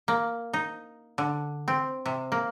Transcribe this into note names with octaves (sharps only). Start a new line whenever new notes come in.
A#3
D#4
D3
C4
C3
A#3